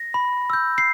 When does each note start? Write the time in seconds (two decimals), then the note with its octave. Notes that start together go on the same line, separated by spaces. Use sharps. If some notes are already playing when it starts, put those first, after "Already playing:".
Already playing: A#6
0.14 B5
0.50 E6 G6
0.78 C7